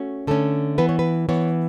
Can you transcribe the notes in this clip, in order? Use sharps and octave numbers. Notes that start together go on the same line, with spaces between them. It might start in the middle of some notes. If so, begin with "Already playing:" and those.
Already playing: A3 C#4 F#4
D3 A3 C#4 A4
E3 B3 B4
C#5
B4
E3 B3 C#5